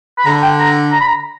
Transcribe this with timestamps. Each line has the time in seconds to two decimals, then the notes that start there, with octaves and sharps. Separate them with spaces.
0.18 B5
0.25 D3 A#5
0.42 G5
0.59 A#5
0.91 A#5
1.00 B5
1.07 A#5